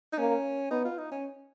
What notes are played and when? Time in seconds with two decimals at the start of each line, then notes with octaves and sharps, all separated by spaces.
0.13 D#4
0.18 A#3 C#4
0.71 B3 D#4
0.85 F4
0.98 D#4
1.11 C#4